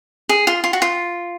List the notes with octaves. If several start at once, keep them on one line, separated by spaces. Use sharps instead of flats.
G#4
F4
F4
F#4
F4